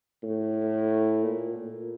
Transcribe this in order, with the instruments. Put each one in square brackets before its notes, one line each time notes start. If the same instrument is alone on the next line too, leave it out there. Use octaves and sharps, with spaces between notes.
[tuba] A2
A#2
A#2